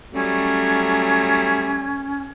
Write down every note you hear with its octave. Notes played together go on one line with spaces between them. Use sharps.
F#3 G3 A3 C#4